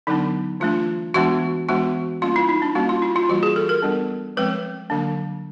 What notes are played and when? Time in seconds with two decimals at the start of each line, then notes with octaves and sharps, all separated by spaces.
0.07 D3 F#3 B3 D4 D#4
0.60 E3 A3 D4 F4
1.14 E3 G#3 B3 D4 F#4
1.68 E3 G#3 B3 D4 F#4
2.22 G3 A#3 C#4 F4
2.36 E4
2.49 D#4
2.62 D4
2.75 G3 A#3 C#4 F#4
2.89 F4
3.02 E4
3.16 F4
3.29 E3 G3 A#3 F#4
3.43 G#4
3.56 A4
3.69 A#4
3.82 G3 B3 D4
4.37 F3 G#3 C4 B4
4.90 D3 F#3 A#3 D4